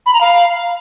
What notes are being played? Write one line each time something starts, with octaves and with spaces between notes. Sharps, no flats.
B5
A#5
F5